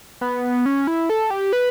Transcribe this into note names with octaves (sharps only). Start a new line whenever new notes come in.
B3
C#4
E4
A4
G4
B4